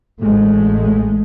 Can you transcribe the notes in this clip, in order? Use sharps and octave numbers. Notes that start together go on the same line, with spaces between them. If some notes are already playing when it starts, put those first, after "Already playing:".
A1 G#3 A3